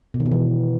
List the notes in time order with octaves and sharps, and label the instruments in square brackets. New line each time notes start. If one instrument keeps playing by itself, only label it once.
[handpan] B2
D#3
B2
E3